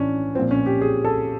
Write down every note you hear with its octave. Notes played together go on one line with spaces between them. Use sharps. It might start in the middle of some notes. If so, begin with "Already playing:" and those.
Already playing: A2 E3 C#4 D4
A#2 F3 C4
C#4
G4
G#4
A4